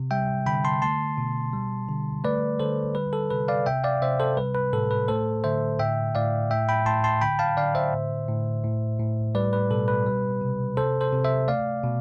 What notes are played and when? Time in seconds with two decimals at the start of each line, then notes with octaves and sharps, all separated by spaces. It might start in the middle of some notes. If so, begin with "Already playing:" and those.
Already playing: C3
0.11 G3 E5 G5
0.46 D3 G5 B5
0.64 A5 C6
0.82 A3 A5 C6
1.18 B2
1.53 G3
1.88 D3
2.24 A3 B4 D5
2.60 D3 A4 C5
2.95 G3 B4
3.13 A4
3.30 C3 B4
3.48 D5 F5
3.66 C3 E5 G5
3.84 D5 F5
4.02 C3 C5 E5
4.20 A4 C5
4.37 G3 B4
4.55 B4
4.73 A2 A4
4.91 B4
5.08 A3 A4 C5
5.44 D3 C5 E5
5.79 A2 E5 G5
6.15 A2 D5 F5
6.50 A2 E5 G5
6.69 G5 B5
6.86 A2 A5 C6
7.04 A5 C6
7.21 D3 G5 B5
7.39 F5 A5
7.57 D3 D5 F5
7.75 C5 E5
7.93 A2
8.28 A2
8.64 A2
8.99 A2
9.35 G3 B4 D5
9.53 B4
9.70 B2 A4
9.88 B4
10.06 G3
10.41 C3
10.77 C3 A4 C5
11.01 A4 C5
11.13 C3
11.25 C5 E5
11.48 A3 D5 F5
11.84 B2